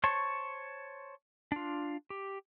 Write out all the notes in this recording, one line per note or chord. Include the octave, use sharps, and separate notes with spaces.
C5 C#5 A5 C#6
D4 F4
G4